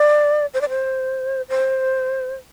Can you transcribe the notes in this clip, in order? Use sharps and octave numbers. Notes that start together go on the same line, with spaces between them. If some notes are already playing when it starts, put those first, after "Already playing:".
Already playing: D5
C5
D5
C5
C5